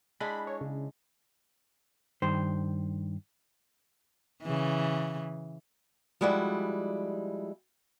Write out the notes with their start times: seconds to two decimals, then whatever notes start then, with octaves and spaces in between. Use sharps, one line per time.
0.20 G#3 D4 E4 B5
0.47 C#5
0.61 C#3
2.22 G2 D#3 C5
4.42 C#3 E3
6.21 F3 G3 G#3 E4 F#4 D5